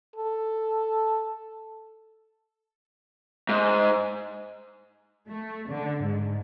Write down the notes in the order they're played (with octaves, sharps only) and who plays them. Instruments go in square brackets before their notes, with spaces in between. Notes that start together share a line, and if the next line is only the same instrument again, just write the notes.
[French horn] A4
[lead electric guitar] G#2
[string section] A3
D3
G#2